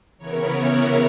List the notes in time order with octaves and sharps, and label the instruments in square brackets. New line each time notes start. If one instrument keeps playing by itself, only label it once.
[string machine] C#3 E3 B3 E4 A#4 C#5